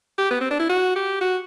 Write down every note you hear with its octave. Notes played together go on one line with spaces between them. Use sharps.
G4
B3
C4
D4
E4
F#4
G4
F#4